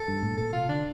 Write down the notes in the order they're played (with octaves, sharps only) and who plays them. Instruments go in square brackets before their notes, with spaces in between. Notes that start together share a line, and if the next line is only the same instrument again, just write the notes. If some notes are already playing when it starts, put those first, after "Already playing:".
Already playing: [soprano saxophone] A4
[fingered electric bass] G2
A2
[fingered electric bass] A#2 [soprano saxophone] A4
[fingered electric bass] C3 [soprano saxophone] F4
[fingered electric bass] D3 [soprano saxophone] D4